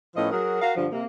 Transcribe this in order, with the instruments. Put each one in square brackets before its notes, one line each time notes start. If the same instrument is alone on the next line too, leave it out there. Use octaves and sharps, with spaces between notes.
[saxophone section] A2 F3 B3 C#4 D#5
F#3 F#4 G#4 A#4
F#4 A#4 F5
G2 D3 F3
C3 A#3